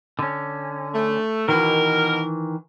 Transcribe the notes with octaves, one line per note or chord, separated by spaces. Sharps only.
D3 C#4
A3
B2 D#3 E3 A#4